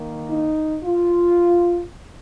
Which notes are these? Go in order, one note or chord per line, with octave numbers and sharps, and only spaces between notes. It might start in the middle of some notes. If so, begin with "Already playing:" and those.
Already playing: D#3 A#3
D#4
F4